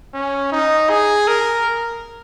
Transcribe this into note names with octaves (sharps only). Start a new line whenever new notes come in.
C#4
D#4
G#4
A#4